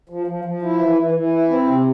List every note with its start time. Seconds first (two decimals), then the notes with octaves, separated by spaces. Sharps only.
0.09 F3
0.27 F3
0.45 F3
0.62 E4
0.79 E3
0.97 E3
1.14 E3
1.33 E4
1.50 C4
1.67 C3